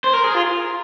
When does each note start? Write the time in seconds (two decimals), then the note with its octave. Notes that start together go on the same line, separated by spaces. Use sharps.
0.04 C5
0.13 A#4
0.24 G#4
0.34 F4